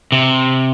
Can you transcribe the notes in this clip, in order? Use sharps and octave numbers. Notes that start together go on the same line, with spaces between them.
C3